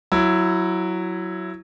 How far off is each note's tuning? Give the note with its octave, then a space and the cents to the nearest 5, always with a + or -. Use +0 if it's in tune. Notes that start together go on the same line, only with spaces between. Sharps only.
F#3 +0 E4 +10